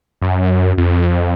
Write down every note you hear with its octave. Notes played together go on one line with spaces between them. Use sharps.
F#2
F2